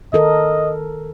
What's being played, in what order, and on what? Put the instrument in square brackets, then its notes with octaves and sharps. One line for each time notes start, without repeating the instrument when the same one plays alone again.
[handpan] D#3 A4 A#4 [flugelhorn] D#5